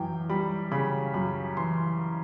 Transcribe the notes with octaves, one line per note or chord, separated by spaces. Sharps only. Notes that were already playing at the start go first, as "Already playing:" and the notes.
Already playing: F#2 E3 G5
G3 B5
C#3 B5
F#2 B5
E3 C6